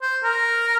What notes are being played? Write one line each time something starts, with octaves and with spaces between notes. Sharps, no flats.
C5
A#4